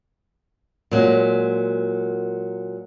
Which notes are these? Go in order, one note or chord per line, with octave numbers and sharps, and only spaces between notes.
A#2 F#3 G#3